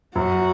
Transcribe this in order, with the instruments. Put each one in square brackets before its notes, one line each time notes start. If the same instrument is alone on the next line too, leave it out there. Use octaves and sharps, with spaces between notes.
[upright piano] F#2 [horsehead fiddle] F#4